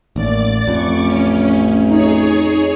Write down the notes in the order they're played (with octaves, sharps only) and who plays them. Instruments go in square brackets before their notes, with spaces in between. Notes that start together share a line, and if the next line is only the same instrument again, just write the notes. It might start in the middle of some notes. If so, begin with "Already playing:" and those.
[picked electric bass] A1 [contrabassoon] D#2 [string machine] D5 A6
[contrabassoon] A1 [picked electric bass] F2 [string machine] C#6 D6
[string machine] C#4
[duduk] D#4 [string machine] G#4 C#5